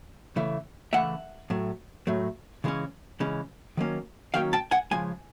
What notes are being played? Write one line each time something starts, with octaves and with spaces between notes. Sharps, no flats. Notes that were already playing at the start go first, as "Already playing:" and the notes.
C#3 E3 A3
C#3 E3 A3 E5 F#5
A2 F#3 A3
A2 F#3 A3
C#3 E3 G#3 C#4
C#3 E3 G#3 C#4
D#3 F#3 A#3 C#4
D#3 F#3 A#3 C#4 F5 G5
G5 A5
F#5 G#5
C#3 F3 G#3 G#5